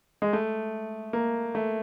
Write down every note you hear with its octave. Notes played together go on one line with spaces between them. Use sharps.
G#3
A3
A#3
A3